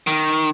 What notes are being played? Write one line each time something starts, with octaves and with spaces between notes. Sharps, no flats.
D#3